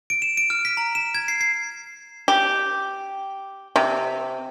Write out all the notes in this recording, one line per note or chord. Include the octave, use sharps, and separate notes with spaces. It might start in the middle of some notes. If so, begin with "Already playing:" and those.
D7
E7
D7
F6
B6
A#5
E7
G#6
C7
C7
G4
C3